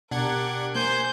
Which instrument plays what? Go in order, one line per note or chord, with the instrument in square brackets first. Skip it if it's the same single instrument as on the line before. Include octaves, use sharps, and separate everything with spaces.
[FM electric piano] B2 [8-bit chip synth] D4 F#5 G#6 [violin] G4 A#4
[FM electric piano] A#3 [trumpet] C5 [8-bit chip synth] G#5 [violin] G6